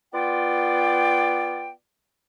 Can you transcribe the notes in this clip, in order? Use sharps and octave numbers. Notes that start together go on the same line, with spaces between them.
B3 F4 D5 G5